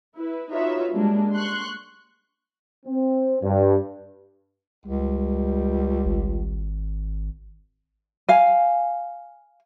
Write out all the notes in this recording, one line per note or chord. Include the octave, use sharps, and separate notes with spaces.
E4 B4
D#4 F4 F#4 B4 C#5 E5
G3 G#3 A#3 D4
C6 C#6 F#6
C4
G2
C#2 G3
G#1
F5 G#5